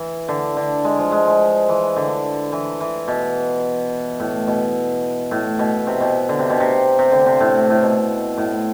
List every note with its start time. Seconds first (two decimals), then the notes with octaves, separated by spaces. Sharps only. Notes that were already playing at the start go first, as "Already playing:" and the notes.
Already playing: E3
0.28 D3
0.57 D3
0.85 G#3
0.98 F3
1.12 G#3
1.27 G#3
1.69 E3
1.96 D3
2.52 E3
2.80 E3
3.08 B2
4.20 A2
4.47 B2
5.31 A2
5.59 B2
5.87 C3
6.00 B2
6.29 D3
6.39 C3
6.50 B2
6.60 C3
6.99 C3
7.11 D3
7.26 C3
7.40 A2
7.70 A2
7.82 B2
8.37 A2